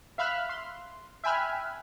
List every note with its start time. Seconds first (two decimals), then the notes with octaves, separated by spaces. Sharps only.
0.18 E5 F5 B5 F6 F#6
0.49 C6
1.24 E5 G5 G#5 B5 F6 F#6